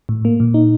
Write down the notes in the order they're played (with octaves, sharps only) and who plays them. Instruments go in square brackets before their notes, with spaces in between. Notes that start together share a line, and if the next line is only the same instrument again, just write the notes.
[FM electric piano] A2
A#3
A#2
D#4